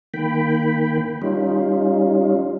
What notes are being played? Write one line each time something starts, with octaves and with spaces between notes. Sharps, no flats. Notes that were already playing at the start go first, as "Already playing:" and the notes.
D#3 A#3 G5 B5
G3 C#4 D#4 F4